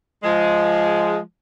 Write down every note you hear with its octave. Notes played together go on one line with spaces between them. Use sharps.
F3 G#3